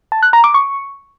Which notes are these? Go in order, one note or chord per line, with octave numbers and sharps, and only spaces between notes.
A5
F#6
A#5
D6
C#6